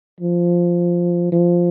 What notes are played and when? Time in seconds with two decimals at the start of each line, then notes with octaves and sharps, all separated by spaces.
0.21 F3
1.32 F3